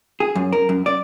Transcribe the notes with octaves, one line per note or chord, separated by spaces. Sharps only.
G#4
F#2
A#4
F#2
D5